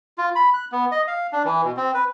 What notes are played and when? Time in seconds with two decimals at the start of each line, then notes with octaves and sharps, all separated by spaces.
0.18 F4
0.36 B5
0.54 F#6
0.72 B3
0.92 D#5
1.08 F5
1.32 D4
1.45 E3
1.64 B2
1.77 C4
1.94 B4